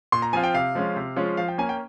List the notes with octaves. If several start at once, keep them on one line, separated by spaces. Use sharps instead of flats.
A#2 C6
A#5
F3 C4 F4 G#5
G5
C3 F5
F3 G#3 C#4 F4
C3
F3 G#3 C#4 F4
F3 F5
G5
A#3 C#4 G#5
G5